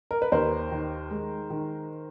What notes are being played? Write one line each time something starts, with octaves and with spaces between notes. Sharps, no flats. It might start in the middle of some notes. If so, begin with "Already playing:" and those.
A#4
B4
D#2 A#4 C5
D#3
G#3
D#3